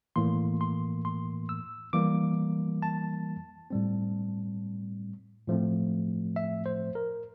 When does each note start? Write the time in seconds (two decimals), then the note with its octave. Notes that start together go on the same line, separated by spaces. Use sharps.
0.16 A2 E3 A#3 C6
0.61 C6
1.05 C6
1.49 E6
1.93 E3 G3 A#3 D6
2.82 A5
3.70 A2 G3 C4
5.47 A2 F3 A3 C4
6.36 E5
6.66 C5
6.95 A#4